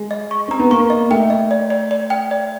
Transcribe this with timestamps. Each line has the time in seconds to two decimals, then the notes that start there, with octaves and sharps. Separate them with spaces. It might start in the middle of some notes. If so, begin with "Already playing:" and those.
Already playing: G#3
0.11 D#5
0.31 C#6
0.48 C4 A#5
0.59 B3
0.71 A#3 C#6
0.90 D#5
1.10 A3 G5
1.30 D#5
1.51 D5
1.70 D5
1.91 D5
2.10 G5
2.31 D5